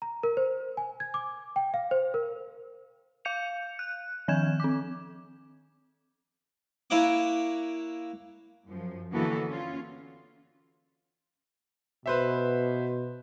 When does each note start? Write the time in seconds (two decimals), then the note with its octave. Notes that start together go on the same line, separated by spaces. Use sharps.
0.02 A#5
0.23 A#4
0.37 C5
0.77 G#5
1.00 G#6
1.14 D6
1.56 G5
1.74 F5
1.91 C5
2.14 A#4
3.25 F5 G6 C#7 F7
3.79 F#6
4.28 D#3 F3 G#5 G6 G#6 E7
4.60 C4 D6
6.90 A#3 E4 C#5 F#5 D6
8.66 F#2 F3
9.13 D3 E3 A#3 B3 F#4 A4
9.46 C#4 F4
12.06 B2 B4 C5 E5